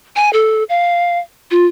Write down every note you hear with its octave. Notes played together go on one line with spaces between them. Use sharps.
G#5
A4
F5
F4